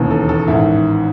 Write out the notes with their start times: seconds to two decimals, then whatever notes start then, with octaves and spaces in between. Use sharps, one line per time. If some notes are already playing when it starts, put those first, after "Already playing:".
Already playing: E1 D#2 C#3 E3
0.11 A4
0.29 A4
0.48 A1 G#2 D#3 E4